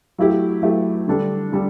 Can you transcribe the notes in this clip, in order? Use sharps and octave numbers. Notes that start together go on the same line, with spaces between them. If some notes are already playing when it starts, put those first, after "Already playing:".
F#3 A3 E4 G4
F#3 A3 E4 G4
D3 G3 D4 A4
D3 G3 D4 A4